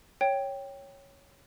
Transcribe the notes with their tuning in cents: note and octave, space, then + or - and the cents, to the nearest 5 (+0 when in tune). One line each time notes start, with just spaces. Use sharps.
C#5 -5 G5 +0